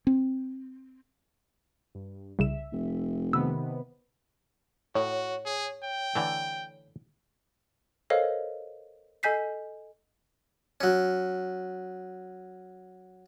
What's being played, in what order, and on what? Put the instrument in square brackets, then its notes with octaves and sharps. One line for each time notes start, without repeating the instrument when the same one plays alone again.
[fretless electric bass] C4
[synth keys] G2
[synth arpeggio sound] C2 C#3 E7 [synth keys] E5
[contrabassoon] F1
[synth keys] C3 D#3 B3 [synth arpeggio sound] E6
[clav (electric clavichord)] A2 [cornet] F#4 [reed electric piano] C#5
[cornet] G#4
G5
[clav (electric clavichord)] D3 E3 A3
[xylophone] A4 A#4 C5 C#5 D#5 F5
A4 D#5 G#5 G6 B6 C7
[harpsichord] F#3 C#4